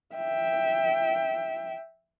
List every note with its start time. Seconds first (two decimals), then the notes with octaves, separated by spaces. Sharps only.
0.15 E5 G5